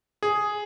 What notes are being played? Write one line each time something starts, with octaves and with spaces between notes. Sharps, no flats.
G#4